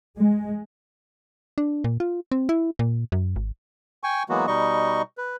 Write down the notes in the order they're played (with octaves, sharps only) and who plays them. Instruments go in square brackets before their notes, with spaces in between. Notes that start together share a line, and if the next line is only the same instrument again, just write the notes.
[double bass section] G#3
[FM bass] D4
A#2
F4
C4
E4
A#2
F#2
G#1
[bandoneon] G5 G#5 C#6
E3 F#3 G#3 A#3 B3 F#4
B2 G3 D#4 D#5 C#6
B4